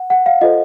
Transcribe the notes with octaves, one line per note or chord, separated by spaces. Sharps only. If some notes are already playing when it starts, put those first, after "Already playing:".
Already playing: F#5
F#5
F5
F4 A4 C5 D#5